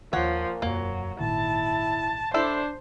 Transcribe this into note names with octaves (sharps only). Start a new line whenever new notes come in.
D#2 A#2 D#3 F3 C#5 F#5
E1 F#2 F#3 A#3
G#1 A#2 D#3 E4 A5
D4 E4 A4 C5 D5